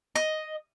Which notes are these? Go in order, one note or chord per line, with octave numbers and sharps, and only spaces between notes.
D#5